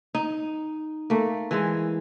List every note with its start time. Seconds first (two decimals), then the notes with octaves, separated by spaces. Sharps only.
0.15 D#4
1.10 A3 A#3
1.51 E3 G#3